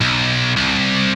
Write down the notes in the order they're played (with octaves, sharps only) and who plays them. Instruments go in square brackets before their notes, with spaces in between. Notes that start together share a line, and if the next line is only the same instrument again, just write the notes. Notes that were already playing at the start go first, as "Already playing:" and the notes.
[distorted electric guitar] B1
C2